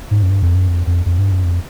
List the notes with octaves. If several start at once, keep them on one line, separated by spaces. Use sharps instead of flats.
G#2
F#2
G2
F2
F#2
F2
F2
F2
G2
F#2
F2